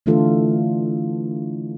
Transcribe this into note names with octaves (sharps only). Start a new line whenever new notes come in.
D3 E3 A3 D4 F4 A4